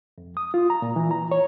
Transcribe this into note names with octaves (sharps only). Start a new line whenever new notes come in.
F2
D#6
F4
A#5
A#2
E3
A#5
C#5